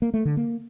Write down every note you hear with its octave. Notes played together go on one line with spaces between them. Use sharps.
A#3
A3
D3
A#3